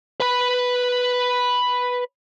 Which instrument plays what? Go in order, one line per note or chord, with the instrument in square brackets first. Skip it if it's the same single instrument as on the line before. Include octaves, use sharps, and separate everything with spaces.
[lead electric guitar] B4 B5